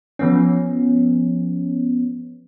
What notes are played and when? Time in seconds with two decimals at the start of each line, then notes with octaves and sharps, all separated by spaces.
0.19 F3 B3 C#4